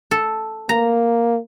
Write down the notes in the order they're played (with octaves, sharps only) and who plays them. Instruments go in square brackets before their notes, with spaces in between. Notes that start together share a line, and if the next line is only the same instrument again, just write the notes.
[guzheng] A4
[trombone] A#3 [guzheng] A#5